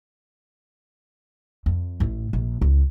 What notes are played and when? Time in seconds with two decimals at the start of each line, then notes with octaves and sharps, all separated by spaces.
1.66 F2
2.00 A1 A2
2.33 A#1
2.62 C#2